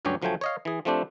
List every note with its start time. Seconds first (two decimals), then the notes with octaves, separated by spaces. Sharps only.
0.05 D2 G2 F#3 C#4 G4 C#5
0.22 D2 F3 F#3 A3 G5 G#5
0.41 C#5 D#5 F5
0.65 E3 G#4
0.85 F3 A3 C4 D4 G4